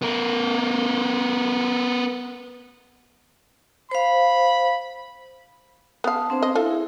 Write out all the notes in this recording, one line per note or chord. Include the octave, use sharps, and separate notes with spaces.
B3 A#4
C5 F5 B5
B3 B4 F5 A5 D#6
C4 D4 C5
D#5
E4 F4 A4 E5
G#4